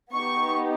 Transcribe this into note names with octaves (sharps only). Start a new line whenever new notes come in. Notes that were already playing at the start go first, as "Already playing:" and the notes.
B3 D#4 G4 C#6